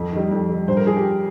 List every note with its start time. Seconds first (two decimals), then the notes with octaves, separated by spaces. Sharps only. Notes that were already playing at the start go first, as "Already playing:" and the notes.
Already playing: F2
0.12 D#3 G3
0.31 F2
0.49 D#3 G3
0.67 G2 C5
0.77 A#4
0.87 F3 G#4
0.97 G4